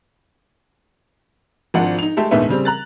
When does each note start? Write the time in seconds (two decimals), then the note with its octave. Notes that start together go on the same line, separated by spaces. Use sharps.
1.74 G#1 F3 D4 D5 F#5
1.99 D#4 F7
2.17 G#3 A3 G4 A5
2.31 A#1 D#2 G#2 A3 B3 E5
2.49 C#3 G3 C4
2.65 A#5 F#6 A6